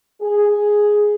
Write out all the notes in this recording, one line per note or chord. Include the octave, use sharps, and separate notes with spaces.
G#4